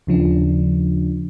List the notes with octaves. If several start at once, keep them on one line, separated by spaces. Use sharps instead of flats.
D#2 C#3 F3 D4